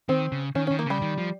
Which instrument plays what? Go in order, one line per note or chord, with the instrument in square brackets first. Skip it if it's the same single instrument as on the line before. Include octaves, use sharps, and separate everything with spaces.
[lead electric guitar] D#3 [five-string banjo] C4
[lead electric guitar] C#3
[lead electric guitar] D#3 [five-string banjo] C#4
[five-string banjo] C#4
[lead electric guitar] D#3
[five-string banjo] A#3
[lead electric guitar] C#3 [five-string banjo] G3
[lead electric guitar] D#3
F3